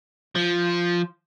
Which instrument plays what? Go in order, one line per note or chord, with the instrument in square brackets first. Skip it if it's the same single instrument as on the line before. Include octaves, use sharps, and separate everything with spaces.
[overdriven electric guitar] F3